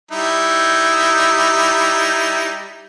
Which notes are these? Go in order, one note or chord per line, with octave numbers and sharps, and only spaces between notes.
G3 D#4 E4